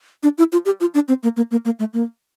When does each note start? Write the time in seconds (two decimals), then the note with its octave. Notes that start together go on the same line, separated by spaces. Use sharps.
0.23 D4
0.38 E4
0.52 F4
0.65 G4
0.80 F4
0.94 D4
1.08 C4
1.23 A#3
1.37 A#3
1.51 A#3
1.65 A#3
1.79 A3
1.93 A#3